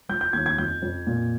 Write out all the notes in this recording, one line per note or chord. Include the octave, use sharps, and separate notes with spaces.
F3 G6
G6
D#2 G#6
G#6
F2 G6
F2
A#2